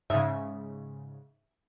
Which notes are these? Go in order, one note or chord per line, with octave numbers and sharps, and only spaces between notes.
G#2 C#3 E5